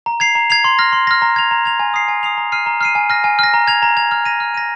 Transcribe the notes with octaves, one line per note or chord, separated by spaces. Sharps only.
A#5
G#6 C7 F7
A#5
G#6 C7 F7
C6
F6 A#6
C6
F6 A#6
A#5
G#6 F7
A#5
G#6 F7
G#5
D#6 C7 F7
G#5
D#6 C7 F7
A#5
F6 C7 D#7
A#5
F6 C7 D#7
G#5
F6 A#6
G#5
F6 A#6
A#5
G#6 F7
A#5
G#6 F7
F6
A#6 D#7
F6
A#6 D#7